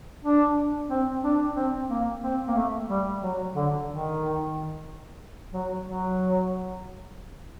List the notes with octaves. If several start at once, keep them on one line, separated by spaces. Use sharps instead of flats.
D4
C4
D4
C4
A#3
C4
A#3
A3
G3
F#3
D3
D#3
F#3
F#3